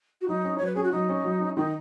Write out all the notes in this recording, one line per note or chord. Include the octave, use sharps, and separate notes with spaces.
F#4
F#3 D#4
C#4
F#3 C#5
B4
C#4 G#4
F#4
F#3 D#4
C#4
F#3
C#4
D#3 D#4